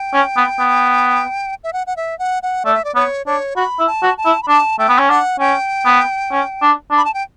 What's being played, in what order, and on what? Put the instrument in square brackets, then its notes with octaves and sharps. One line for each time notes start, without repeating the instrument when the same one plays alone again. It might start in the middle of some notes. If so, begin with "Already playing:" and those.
Already playing: [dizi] G5
[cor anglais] C#4
B3
B3
[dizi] E5
F#5
F#5
E5
F#5
F#5
[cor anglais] A3 [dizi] D5
[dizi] E5
D5
[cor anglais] B3 [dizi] C#5
[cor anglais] D4 [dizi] C#5
[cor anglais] F#4 [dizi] B5
[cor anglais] E4
[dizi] A5
[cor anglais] F#4
[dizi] A5
[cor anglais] E4
[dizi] B5
[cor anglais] D4 [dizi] A5
[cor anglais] A3 [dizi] G5
[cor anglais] B3
C#4
[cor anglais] D4 [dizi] F#5
[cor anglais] C#4 [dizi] G5
[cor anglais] B3
C#4
D4
D4
[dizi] B5
A5
G5